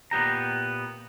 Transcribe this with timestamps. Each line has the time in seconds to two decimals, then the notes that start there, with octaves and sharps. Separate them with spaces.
0.11 A#2 B3 G4 A#5